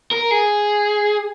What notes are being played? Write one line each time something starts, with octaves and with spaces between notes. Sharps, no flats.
A#4
G#4